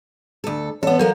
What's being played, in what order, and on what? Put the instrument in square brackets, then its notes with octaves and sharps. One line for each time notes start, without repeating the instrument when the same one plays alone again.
[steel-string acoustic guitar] D2 A4
[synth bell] E3 F#5 [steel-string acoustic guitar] B3 A4 [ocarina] C#5
[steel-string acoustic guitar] F#3 A#3 F#4 [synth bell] A4 [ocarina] A#4